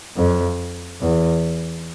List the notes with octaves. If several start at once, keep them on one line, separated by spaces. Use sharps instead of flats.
F2
E2